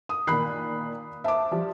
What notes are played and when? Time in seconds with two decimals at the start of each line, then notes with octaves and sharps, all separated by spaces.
0.09 D#6
0.27 A#2 D#3 B5 F#6 C7
1.24 C5 E5 A5 D6
1.51 F3 G3